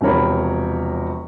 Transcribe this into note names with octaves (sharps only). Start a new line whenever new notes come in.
E1 C3 F3 A#4 C#5 B5